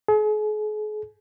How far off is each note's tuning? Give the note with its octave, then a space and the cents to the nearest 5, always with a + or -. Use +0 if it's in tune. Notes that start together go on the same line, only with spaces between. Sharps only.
G#4 +40